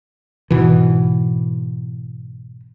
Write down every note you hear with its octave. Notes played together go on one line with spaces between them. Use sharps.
G#2 B2 E3